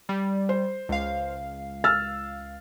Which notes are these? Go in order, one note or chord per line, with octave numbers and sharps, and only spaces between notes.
G3
C5
C#2 F5
E6 F6 A6